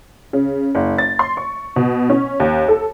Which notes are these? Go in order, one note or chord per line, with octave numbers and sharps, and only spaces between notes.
C#3
F#1
A6
C6
C#6
B2
C#4
D#2
A4